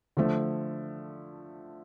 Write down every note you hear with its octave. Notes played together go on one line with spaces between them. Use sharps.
D3 F3 A3